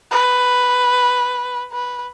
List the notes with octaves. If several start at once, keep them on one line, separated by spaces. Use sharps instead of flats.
B4
B4